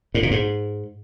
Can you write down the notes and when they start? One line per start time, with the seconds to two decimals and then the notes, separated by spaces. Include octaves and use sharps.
0.14 A2
0.23 A#2
0.31 G#2